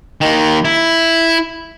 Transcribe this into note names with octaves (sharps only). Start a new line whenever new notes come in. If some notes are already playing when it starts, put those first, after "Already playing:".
D#3 A#3
E4